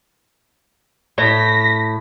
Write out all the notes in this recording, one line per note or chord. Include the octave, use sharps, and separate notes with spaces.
A2 A#6 B6